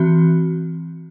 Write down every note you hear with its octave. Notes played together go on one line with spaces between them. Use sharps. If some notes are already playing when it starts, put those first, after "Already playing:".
Already playing: E3 C4 F#4